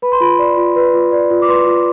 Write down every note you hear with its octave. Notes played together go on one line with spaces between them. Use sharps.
B4 B5
C6
F4 B5
D5
F4
B4
F4
D5
F4
D6
B4 C6
F4